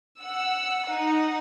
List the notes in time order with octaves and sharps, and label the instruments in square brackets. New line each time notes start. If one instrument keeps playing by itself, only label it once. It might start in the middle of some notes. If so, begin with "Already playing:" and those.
[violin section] F#5 E6
D#4 F#5